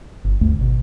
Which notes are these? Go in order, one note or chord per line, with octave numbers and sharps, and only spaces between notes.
G1
D1 D2 G2 A3
G#1 B2